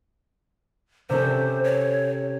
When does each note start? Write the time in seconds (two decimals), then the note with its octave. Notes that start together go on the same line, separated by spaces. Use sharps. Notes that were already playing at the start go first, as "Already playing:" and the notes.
1.10 C3 C#4 A4 C5
1.64 C#5